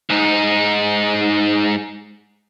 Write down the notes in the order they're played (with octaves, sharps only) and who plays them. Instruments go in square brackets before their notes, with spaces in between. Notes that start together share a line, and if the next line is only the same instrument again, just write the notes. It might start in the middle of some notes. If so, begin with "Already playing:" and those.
[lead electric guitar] G#2 D#4